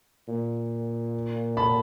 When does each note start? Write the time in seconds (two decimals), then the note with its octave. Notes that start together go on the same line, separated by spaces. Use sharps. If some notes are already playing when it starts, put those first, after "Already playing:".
0.28 A#2
1.57 A5 B5